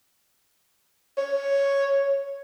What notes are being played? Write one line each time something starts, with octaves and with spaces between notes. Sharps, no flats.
C#5